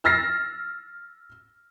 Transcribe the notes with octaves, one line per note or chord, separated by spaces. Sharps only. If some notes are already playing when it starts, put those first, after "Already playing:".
E6 F6 A6 A#6 C7